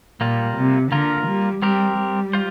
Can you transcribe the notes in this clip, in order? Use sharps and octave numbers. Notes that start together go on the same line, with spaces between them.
A#2 G3 A#3 F4
C3
D3 A#3 F4 A#4
G3
G3 C4 G4 A#4
G3
F4 C5